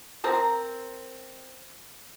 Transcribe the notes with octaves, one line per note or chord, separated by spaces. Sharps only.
C4 A#4 A#5